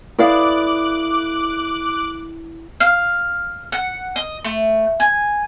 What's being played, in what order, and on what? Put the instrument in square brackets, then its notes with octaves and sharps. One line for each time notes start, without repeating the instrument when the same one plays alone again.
[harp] E4 A4 D#6 [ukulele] B4 D5 F5 [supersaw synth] D6 F#6
[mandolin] F5
F#5
D#5
A3
G#5